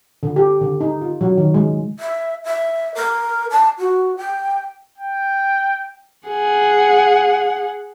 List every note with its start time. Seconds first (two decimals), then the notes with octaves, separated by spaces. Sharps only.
0.23 D3
0.36 G4
0.61 D3
0.81 D#4
1.01 F4
1.21 F#3
1.38 D#3
1.54 G#3
1.99 E5
2.44 E5
2.95 A#4
3.51 A5
3.78 F#4
4.17 G5
4.98 G5
6.28 G#4 F#5